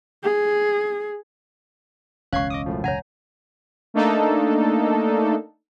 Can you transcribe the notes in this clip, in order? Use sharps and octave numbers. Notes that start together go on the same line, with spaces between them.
G#4
E1 C#2 C#4 F5 C#6 F#6 G#6 C7
D#5 D6 D#6
F#2 A2 F3
F#2 C#3 C#5 F#5 G#5 A#5
A3 A#3 D4 D#4 A4